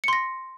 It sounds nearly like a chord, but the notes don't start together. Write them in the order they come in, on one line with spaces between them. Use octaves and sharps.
C#7 C6 A#6